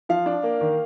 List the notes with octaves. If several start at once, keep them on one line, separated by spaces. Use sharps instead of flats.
F3 F5
D4
A#3
D#3